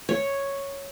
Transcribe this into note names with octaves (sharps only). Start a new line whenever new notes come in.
C#5